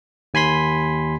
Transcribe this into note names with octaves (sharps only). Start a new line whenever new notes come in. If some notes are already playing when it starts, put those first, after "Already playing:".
D#2 G#5 B5 C6 B6